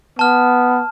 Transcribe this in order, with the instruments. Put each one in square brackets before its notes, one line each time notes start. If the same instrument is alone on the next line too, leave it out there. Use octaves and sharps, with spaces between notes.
[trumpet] B3 [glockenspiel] A5 F6